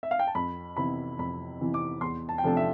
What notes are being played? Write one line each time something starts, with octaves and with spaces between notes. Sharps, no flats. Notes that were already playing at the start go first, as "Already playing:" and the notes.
E5
F5
G5
A5
F2 B5
C3 E3 B3 E4 B5
F2 B5
C3 E3 B3 E4
D6
E2 C6
A5
G5
C3 F3 A3 D4 A5
E5